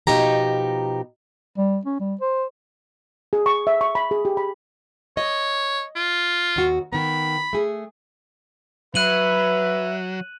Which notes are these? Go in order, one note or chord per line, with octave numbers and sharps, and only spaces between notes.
B2 F3 D#4 G4 A#5
G3
C#4
G3
C5
G#4
C#6
E5
C#6
B5
G#4
G4
B5
C#5 D#5
F4
D#2 F#4
D#3 B3 B5
A3 G#4
F#3 B4 E5 F#6 D#7 F#7